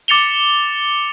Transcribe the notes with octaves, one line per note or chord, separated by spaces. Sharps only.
D6 A6 C#7 F7 G7